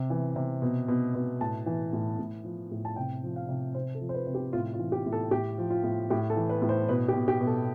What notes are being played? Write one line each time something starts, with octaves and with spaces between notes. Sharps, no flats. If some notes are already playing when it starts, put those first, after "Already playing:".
Already playing: C3
E3
C3
B2
B2
B2
A2 A5
E3
A2
A2
F3
A2
A5
C3 G5
F3
F5
C3
C3 C5
A4
F3
C5
B4
C3
G4
A2 F4
F4
E3
G4
A2
A4
A2 G4
F3
F4
A2
A2 G4
A4
E3
B4
A2
C5
B2 B4
G4
B2
G4
B2
A4